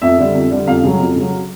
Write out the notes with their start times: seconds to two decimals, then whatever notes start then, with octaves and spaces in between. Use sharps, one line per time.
0.02 F2 E5
0.18 D3 G3
0.35 F2
0.51 D3 G3
0.67 F2 F5
0.84 C#3 F#3
1.00 F2
1.16 C#3 F#3